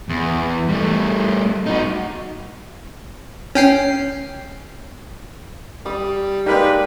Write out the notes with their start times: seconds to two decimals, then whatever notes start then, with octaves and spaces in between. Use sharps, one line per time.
0.09 E2
0.69 G3 A3
1.66 D#4 F#4
3.55 C#4 G5 C7
5.86 G3 D#6
6.46 G#3 A#3 D#4 G4 B4 D5